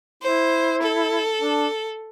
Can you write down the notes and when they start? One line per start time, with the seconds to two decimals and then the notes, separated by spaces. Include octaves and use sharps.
0.22 E4 C5
0.82 A4
1.41 D4